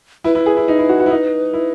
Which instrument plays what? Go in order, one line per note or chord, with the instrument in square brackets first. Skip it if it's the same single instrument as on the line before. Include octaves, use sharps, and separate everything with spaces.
[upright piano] E4 [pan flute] B4
[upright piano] E4
G#4
E4
D#4
E4
F#4
F#4
E4
D#4
E4